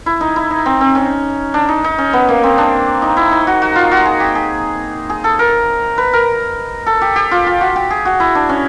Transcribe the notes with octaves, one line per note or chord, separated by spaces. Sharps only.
E4
D#4
E4
D#4
C4
C4
C#4
D4
D#4
D#4
C#4
B3
A#3
C4
D4
D#4
E4
D#4
F#4
F#4
F4
F#4
G#4
G4
G#4
G#4
A4
A#4
B4
A#4
A4
G4
G4
F4
F4
F#4
G4
G#4
F#4
E4
D4
C#4